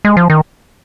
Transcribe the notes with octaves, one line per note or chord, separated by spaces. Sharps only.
G#3
F3
D#3